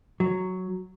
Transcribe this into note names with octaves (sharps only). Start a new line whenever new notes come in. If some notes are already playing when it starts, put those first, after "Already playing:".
F#3